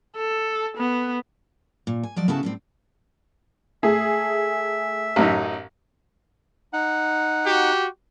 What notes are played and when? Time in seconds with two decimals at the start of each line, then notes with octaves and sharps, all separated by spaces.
0.17 A4
0.78 B3
1.87 A#2
2.03 G#5
2.16 F3 F#3 D5 D#5
2.28 C#3 B3 E4 F#4 A4 A5
2.43 A2 G3 C4
3.83 A3 G#4 E5
5.16 A1 F#2 D#4
6.73 D#4 F#5
7.46 F#4 G4